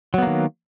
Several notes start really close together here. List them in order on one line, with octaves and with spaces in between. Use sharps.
F#3 B3 A#3 D#3